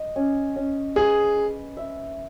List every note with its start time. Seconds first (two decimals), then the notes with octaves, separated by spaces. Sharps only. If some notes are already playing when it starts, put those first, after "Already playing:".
Already playing: D#5
0.16 C#4
0.56 C#4
0.96 G#4 B4
1.37 B4
1.77 E5